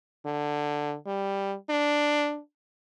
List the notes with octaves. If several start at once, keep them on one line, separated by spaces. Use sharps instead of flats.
D3
G3
D4